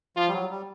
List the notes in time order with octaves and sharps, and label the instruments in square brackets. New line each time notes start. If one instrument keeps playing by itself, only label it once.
[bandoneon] F3 [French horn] F4
[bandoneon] G3
F#3
G3